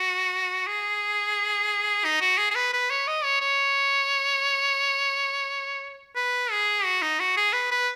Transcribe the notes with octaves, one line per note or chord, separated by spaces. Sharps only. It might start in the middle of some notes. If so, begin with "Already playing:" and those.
Already playing: F#4
G#4
D#4
F#4
G#4
G#4
B4
B4
C#5
D#5
C#5
C#5
B4
G#4
F#4
D#4
F#4
G#4
B4
B4